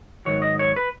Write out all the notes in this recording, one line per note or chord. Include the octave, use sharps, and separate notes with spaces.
G#2 D#3 F#3 C#5
D#5
C#5
B4